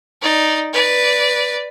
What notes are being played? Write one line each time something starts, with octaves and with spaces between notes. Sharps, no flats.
D#4 D5
B4 D5